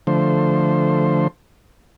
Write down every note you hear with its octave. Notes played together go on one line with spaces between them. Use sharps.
D3 F3 A3 C5